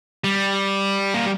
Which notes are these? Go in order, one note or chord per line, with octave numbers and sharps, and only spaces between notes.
G3
A#3